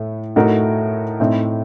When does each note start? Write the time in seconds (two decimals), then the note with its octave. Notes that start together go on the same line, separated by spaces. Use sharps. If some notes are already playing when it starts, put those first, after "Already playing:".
Already playing: A2 A3
0.36 A2 A3 D#4 F#4 A#4
1.20 A2 A3 C4 D#4